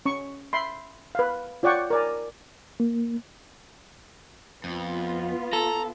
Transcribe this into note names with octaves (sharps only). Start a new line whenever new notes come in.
C#4 C#6
E5 B5 C6
B4 F5
F4 C#5 D5 F#5 G5 C#6
A#4 D5 G#5
A#3
F2 B3 F4
A4 A#5